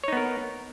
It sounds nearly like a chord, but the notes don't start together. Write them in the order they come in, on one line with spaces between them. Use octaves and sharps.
C#5 D#4 B3 A#4